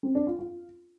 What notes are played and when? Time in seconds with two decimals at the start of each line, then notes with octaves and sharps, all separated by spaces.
0.03 C4
0.15 D4
0.27 F4
0.39 F4